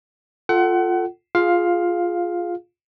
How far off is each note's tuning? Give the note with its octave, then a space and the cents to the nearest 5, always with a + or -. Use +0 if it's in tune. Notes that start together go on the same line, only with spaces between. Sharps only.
F4 +5 A4 +0 F#5 +30
F4 +0 G#4 +0 F5 +10